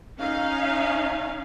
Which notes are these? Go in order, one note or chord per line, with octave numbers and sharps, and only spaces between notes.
C#4 D#4 F5